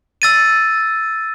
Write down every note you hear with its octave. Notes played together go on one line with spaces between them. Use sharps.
E6 A6 D#7